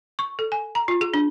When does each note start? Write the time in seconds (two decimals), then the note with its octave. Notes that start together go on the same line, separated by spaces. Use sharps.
0.19 C#6
0.39 A4
0.52 G#5
0.75 A#5
0.88 F4
1.01 G#4
1.14 D4